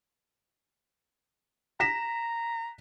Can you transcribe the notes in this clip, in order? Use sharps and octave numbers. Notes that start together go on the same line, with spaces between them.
A#5 A#6 B6 E7